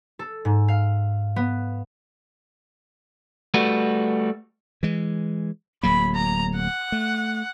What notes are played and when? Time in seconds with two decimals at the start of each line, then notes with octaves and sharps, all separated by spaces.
0.19 A4
0.45 G#2
0.68 F5
1.36 B3
3.54 G3 A3 F#4 B4
4.83 E3 G#3
5.83 D1 F#3 A#3 B5
6.15 A#5
6.56 F#5
6.92 A3